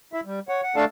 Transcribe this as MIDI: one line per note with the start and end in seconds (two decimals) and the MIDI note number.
0.13 0.21 64
0.13 0.21 76
0.25 0.39 55
0.49 0.62 73
0.49 0.62 78
0.62 0.76 78
0.76 0.85 57
0.76 0.85 62
0.76 0.85 69
0.76 0.85 74
0.76 0.85 77
0.76 0.85 81